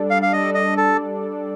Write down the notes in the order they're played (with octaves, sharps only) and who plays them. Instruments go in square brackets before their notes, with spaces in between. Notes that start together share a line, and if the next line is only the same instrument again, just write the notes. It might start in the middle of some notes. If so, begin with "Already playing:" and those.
Already playing: [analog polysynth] G3 D4 A4 D5
[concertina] F5
F5
[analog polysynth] G3 D4 A4 D5 [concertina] D#5
[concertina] D#5
A4